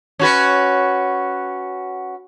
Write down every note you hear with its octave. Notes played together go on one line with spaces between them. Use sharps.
C#4 F#4 B4